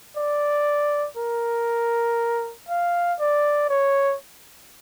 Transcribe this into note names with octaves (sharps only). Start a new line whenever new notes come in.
D5
A#4
F5
D5
C#5